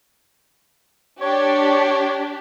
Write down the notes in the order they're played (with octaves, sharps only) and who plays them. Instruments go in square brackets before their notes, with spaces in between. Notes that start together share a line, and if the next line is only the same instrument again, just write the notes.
[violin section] D4 G4 [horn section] C#5